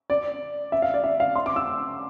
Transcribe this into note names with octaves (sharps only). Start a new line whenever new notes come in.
D5
E5
F5
D5
E5
F5
C6
D6
E6